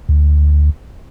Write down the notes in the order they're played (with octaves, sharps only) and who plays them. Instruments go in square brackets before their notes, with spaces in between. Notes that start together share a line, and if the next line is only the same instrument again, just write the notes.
[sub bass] D2